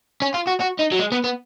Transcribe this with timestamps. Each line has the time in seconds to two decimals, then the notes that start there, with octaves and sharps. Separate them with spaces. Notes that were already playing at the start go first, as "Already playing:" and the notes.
0.22 C#4
0.34 F4
0.47 F#4
0.60 F#4
0.79 D#4
0.92 F#3
0.99 G#3
1.12 B3
1.24 B3